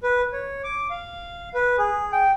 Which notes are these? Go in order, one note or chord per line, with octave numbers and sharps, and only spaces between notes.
B4
C#5
D6
F5
B4
G#4
G5